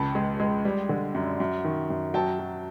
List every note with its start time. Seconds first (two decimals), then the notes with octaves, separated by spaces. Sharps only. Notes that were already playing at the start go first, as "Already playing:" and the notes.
Already playing: C#2 C#3 A5 B5
0.15 G#3
0.40 G#3
0.65 G3
0.89 D3
1.15 F#2
1.40 F#2
1.64 D#3
1.90 F#2
2.14 F#3 G5 A5
2.39 F#3